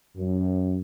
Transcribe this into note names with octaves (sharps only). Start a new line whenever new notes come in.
F#2